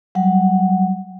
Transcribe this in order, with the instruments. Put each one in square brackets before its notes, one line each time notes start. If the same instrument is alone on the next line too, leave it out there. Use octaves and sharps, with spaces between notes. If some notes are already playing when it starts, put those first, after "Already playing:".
[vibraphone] F#3 G3 F#5